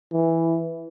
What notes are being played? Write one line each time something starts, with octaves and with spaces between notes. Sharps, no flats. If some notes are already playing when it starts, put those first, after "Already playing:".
E3